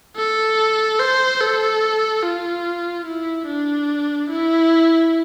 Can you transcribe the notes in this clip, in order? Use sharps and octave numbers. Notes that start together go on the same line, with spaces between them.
A4
C5
A4
F4
E4
D4
E4